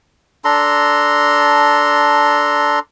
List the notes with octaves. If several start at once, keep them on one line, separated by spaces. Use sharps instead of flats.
D4 A4 A#5 C6